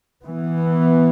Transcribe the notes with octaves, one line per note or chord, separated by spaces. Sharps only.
E3 B3